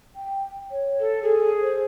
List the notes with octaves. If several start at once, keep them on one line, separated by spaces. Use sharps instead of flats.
G5
C#5
A4
G#4 A4
C5